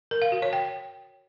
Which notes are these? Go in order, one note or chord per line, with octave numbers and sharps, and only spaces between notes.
A#4
F5
F#4
C#5
G5